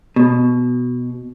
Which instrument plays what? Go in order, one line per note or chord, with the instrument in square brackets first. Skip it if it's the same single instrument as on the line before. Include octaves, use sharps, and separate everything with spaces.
[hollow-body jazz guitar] B2